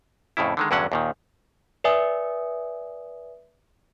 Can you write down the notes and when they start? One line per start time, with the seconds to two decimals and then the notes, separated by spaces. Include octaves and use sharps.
0.37 F2 A2 C#3 E4
0.57 D3 D#3 G#3
0.71 E2 G2 D3 F#3 C#4 F#5
0.92 D#2 A#2 D#3
1.84 B4 D5 E5 G#5 D#6